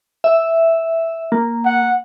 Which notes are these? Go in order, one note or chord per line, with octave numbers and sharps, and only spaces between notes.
E5
A#3
F#5